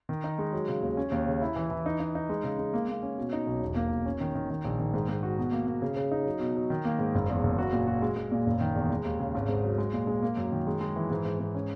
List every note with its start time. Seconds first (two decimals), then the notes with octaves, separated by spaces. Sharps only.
0.09 D#3
0.24 D#4
0.39 G#3
0.53 F#3
0.68 C#3
0.82 D#2
0.97 C#4
1.12 D#2
1.26 C#3
1.42 E4
1.56 E3
1.70 E3
1.86 D#4
2.00 D#4
2.15 D#4
2.29 G#3
2.44 C#3
2.59 G#3
2.74 A#3
2.88 A#3
3.03 C#4
3.18 B2
3.33 D#4
3.47 B1
3.62 E1
3.76 A#3
3.91 E1
4.06 C#4
4.21 D#3
4.35 D#3
4.50 D#3
4.65 A#1
4.80 D#3
4.94 G#2
5.08 G#2
5.23 F#4
5.38 B2
5.52 A#3
5.67 A#3
5.82 C#3
5.96 C#3
6.11 D#4
6.26 F#3
6.40 B2
6.56 F#3
6.70 D#3
6.85 A#3
6.99 G#2
7.15 F#1
7.29 E2
7.43 F#1
7.58 F#4
7.73 A#2
7.87 F#4
8.02 G#3
8.17 G#3
8.32 A#2
8.46 F#1
8.61 D#3
8.76 E2
8.90 G#3
9.05 D#2
9.20 C#3
9.35 G#1
9.48 G#2
9.64 F#3
9.78 G#3
9.93 A#2
10.07 G#3
10.22 A#3
10.37 F#2
10.52 D#3
10.67 G#3
10.81 G#3
10.96 E3
11.11 G#2
11.25 G#2
11.40 G#2
11.55 C#4